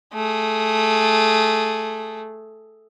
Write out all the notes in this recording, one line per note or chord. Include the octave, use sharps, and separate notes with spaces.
A3 G#4